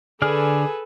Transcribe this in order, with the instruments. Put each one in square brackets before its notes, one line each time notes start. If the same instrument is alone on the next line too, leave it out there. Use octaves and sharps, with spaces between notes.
[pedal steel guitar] D3 D5 F6 [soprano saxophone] G#4 [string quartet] A4 B4 G#5